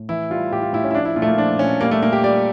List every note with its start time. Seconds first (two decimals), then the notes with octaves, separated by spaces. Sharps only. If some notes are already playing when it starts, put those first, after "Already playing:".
Already playing: A2
0.09 E3 E4
0.30 G3 F4
0.51 A2 G4
0.62 F4
0.73 A2 E4
0.84 C#4
0.91 E4
0.95 F3 D4
1.05 E4
1.16 A#2 F4
1.22 A3
1.28 A#3
1.37 F3 D4
1.59 A#2 C#4
1.81 G3 A#3
1.91 A3
2.02 A#2 A#3
2.13 G4
2.24 G3 D5